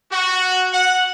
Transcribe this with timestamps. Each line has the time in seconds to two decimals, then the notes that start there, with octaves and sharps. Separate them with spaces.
0.11 F#4
0.73 F#5